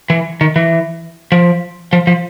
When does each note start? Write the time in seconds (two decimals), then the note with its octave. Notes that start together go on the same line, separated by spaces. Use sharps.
0.10 E3
0.41 D#3
0.56 E3
1.32 F3
1.93 F3
2.07 F3